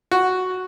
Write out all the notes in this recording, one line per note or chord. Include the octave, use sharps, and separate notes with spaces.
F#4